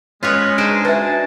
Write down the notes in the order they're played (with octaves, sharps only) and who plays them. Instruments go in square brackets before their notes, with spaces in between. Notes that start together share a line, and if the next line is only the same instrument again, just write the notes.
[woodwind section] G#3 [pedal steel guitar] C#4 [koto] F4 B4 C#5
[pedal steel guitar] D4 [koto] D#4 G#4 C5 [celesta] D7
[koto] F#4 [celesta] B4 E5 [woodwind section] G#5 A5